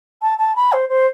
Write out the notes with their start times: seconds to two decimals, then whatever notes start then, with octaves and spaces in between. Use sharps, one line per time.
0.22 A5
0.38 A5
0.55 B5
0.72 C5
0.89 C5